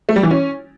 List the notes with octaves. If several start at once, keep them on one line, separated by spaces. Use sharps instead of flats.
A3
G3
E3
C#4